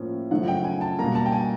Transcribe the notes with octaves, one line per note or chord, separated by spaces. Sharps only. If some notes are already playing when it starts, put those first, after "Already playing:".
Already playing: A2 F3 A#3 C#4
F#2 C#3 F3 A3 F#5
G5
G#5
A5
B2 G3 A#3 A#5
A5
G5
G#5